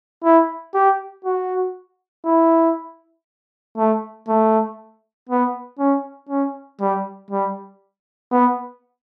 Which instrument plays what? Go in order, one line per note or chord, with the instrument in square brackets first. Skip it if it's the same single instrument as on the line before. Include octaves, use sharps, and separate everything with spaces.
[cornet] E4
G4
F#4
E4
A3
A3
B3
C#4
C#4
G3
G3
B3